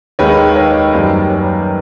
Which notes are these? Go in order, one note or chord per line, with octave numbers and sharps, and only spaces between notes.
D#2 D#3 G#3 B4 C#5
C#5 D#5
F#2 D#3 G3 A#3 C5 D5
B4 C#5